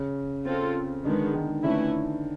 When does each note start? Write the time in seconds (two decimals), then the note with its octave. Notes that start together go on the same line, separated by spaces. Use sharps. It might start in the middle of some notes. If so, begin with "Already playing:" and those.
Already playing: C#3
0.45 C4 F4 A4
1.05 D3 D#3 G#3 B3
1.34 D#3
1.64 D3 E3 A3 C#4 E4